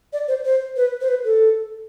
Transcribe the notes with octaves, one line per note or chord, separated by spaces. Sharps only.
D5
C5
C5
B4
C5
B4
A4